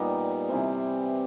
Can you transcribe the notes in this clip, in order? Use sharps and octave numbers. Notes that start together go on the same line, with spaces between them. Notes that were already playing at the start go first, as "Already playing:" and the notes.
Already playing: A#2 G3 B3 D#4 G4
C3 E3 G3 C4